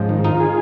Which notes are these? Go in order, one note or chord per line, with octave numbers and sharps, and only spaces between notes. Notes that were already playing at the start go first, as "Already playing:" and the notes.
Already playing: G#2 F3 G#3 C#4
D#3
D#4 F4
G#4